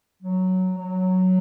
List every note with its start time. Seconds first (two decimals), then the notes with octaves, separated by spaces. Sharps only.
0.23 F#3
0.77 F#3